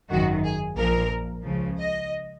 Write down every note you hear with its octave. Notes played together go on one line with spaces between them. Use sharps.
G#1 F#2 D#3 F#4
G#4
A#1 A#2 F3 A#4
C#2 C#3 F3
D#5